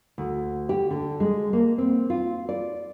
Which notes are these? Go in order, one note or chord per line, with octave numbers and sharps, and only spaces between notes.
D2
G4
D3
G#3
A#3
C4
F4
D5